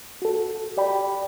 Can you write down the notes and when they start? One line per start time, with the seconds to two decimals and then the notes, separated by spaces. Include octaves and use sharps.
0.22 F#4 A4
0.77 G4 D5 G5 B5